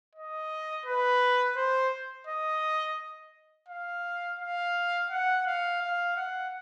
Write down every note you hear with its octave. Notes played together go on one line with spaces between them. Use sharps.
D#5
B4
C5
D#5
F5
F5
F#5
F5
F5
F#5